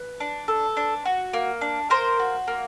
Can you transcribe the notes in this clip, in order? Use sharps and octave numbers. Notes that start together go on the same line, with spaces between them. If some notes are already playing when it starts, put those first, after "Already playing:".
Already playing: B4
D4
A4
D4
F#4
A#3
D4
A#3 A#4 C5
F#4
A#3